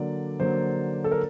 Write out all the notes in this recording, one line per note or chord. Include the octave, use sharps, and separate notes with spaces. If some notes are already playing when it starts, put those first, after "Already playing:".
Already playing: D3 F#3 A#3 D5
D3 F#3 A#3 C5
A4
A#4